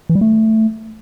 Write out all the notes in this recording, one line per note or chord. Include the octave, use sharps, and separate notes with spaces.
E3
G3
A3